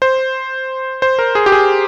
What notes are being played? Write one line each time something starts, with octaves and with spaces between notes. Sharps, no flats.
C5
C5
A#4
G#4
G4
G#4